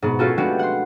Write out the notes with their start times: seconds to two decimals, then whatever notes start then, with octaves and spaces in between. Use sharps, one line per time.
0.02 G#2 B2 B3
0.19 C#4 F4 F#4 A4
0.38 G#3 A3 B3 D4 F#4 G4
0.59 F#5 C6